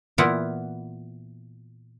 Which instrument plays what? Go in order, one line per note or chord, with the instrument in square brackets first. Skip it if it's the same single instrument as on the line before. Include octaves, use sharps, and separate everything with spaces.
[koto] A#2 E3 B3 E4 F4 F#5